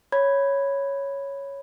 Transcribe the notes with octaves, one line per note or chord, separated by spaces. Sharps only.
C#5 B5 G#6